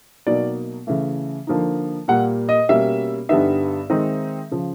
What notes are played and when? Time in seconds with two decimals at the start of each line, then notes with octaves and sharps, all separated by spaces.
0.26 B2 F#3 A#3 D#4 D5
0.87 C#3 E3 A3
1.47 D3 F3 A#3 D#4
2.08 A#2 G3 A#3 F#5
2.49 D#5
2.69 B2 G3 A#3 C#4 E5
3.29 G2 D3 G3 B3 D#4 E5
3.90 D#3 G#3 C4 D#4
4.51 C#3 F3